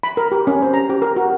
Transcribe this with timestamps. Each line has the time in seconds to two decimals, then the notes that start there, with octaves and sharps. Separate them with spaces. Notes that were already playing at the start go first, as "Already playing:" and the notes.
0.03 B5
0.17 A#4
0.32 G4
0.47 C#4
0.62 C5
0.74 A#5
0.89 G4
1.02 A#4
1.16 F#4